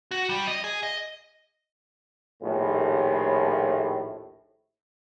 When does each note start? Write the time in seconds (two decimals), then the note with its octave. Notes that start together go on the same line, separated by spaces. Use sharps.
0.11 F#4
0.29 G3
0.47 D#5
0.64 G#4
0.83 D#5
2.43 A#1 D#2 A2